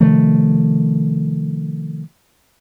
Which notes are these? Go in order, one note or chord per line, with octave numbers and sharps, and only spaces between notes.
C3 D#3 F3 A3